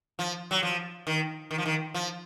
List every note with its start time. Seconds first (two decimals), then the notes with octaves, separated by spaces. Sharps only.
0.19 F3
0.51 F#3
0.63 F3
1.07 D#3
1.51 D#3
1.58 F3
1.66 D#3
1.94 F3